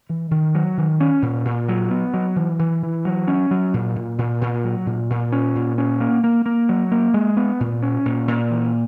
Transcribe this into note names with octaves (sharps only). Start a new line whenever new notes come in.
E3
D#3
F#3
D#3
C#4
A#2
A#2
F#3
B3
F#3
E3
E3
E3
F#3
C#4
F#3
A#2
A#2
A#2
A#2
F#3
A#2
A#2
C#4
A#2
C#4
A#3
A#3
A#3
F#3
A#3
G#3
B3
A#2
C#4
A#2
A#2
E3